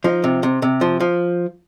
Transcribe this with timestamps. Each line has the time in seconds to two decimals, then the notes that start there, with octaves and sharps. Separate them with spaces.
0.04 F3 D#4
0.24 C3
0.43 C3
0.62 C3
0.81 F3
1.00 F3